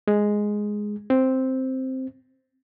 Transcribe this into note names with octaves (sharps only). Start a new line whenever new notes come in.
G#3
C4